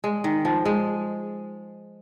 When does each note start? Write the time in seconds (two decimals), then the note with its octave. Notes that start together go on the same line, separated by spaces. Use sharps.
0.04 G#3
0.24 D#3
0.45 F3
0.65 G#3